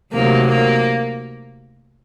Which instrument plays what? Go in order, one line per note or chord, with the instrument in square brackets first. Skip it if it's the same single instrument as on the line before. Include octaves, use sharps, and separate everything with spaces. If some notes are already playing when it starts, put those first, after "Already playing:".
[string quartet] D2 C3 D#3 F#3 A#3
A#3